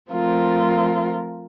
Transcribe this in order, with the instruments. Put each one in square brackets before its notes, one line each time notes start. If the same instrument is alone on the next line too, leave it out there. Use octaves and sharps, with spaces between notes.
[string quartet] F3 A3 C4 F4 A#4